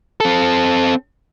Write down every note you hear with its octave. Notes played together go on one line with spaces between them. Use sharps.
C4 A4